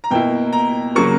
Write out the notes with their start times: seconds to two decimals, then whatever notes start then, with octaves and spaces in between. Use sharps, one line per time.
0.04 A#5
0.11 B2 A#3 E4 G5
0.53 A#5
0.95 C#3 F#3 A#3 C#6